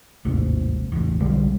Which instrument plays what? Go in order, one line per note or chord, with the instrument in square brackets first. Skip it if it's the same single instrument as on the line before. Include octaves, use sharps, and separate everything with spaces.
[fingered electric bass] A1 D#2 G#2 C3
A1 E2
B1 D3 G3 G#3